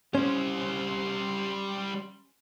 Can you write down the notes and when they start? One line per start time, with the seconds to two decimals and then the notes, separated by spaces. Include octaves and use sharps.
0.15 G3 C#4 C5 C6